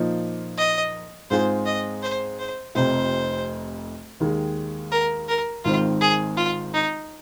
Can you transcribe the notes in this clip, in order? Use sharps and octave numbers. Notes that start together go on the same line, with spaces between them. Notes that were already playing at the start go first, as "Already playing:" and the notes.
Already playing: A#2 F3 A#3 D#4
D#5
G#2 G#3 C4 F4 G#4 C5
D#5
C5
C5
F1 F2 C3 C5
D#2 D#3 G#3
A#4
A#4
G#1 G#2 D#3 C4 F4
G#4
F4
D#4